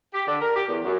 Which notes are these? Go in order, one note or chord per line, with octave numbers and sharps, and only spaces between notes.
G4
D3
A#4
G4
E2
F#2